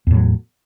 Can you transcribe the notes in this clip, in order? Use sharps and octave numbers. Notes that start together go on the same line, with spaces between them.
E2 A2 F#3